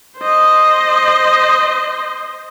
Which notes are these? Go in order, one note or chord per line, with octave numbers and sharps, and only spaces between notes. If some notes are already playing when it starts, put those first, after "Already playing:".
C5 D#5